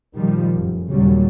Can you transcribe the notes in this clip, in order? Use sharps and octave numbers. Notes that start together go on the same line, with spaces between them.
A#2 D#3 F3 G3
F1 F#2
D#2 A#2 C#3 F#3 G3